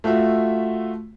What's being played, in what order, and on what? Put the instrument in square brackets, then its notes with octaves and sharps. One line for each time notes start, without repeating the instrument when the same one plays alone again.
[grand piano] A3 F4 F#4 E5